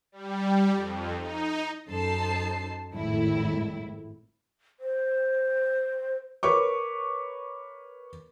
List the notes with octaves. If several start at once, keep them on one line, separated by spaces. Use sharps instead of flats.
G3
F2
D#4
F#2 D#4 A4 C5 A5 C7
G#1 F2 A2 E4
C5
A#4 B4 C#5 C#6 D6